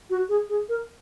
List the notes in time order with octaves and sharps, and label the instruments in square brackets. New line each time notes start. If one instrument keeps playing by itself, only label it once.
[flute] F#4
G#4
G#4
A#4